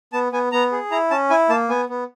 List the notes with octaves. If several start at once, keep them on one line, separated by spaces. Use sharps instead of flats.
B3 A5
B3 G#5
B3 A#5
G#4
E4 A#5
C#4 A5
E4 G#5
A#3 A5
B3 G#5
B3